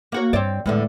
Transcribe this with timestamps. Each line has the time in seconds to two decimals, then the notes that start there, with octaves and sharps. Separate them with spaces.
0.12 A#3 F#4 C#5
0.33 G2 C4 C#5 D5
0.66 E2 A2 D3 G#3